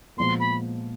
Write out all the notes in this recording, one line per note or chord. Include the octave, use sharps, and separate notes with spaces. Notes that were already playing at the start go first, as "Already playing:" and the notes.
A#2 F3 G#3 B3 C6
B5